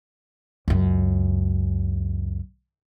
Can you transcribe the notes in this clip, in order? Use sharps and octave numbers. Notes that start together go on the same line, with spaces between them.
C#2 F#2